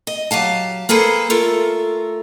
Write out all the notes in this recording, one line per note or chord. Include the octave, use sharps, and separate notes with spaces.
D#5
F#3 G4 F5 A5
A#3 G#4 A4 B4 C5
A3 F4 A4 A#4